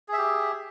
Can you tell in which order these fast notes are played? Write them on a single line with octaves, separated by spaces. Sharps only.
G#4 E5 G4